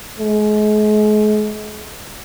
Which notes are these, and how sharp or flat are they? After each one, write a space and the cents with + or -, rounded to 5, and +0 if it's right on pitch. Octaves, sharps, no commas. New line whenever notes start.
G#3 +35